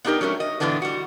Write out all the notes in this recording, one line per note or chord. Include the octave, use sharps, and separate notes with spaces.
B3 D4 D#4 G4 A#4
F#3 A3 C#4 G#4 A#4
D#5
G2 A#2 D3 E3 B3 D4
G3 F#4